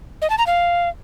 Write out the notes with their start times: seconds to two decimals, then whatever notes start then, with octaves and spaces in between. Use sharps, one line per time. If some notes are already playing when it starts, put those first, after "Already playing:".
0.22 D#5
0.30 A5
0.38 A#5
0.47 F5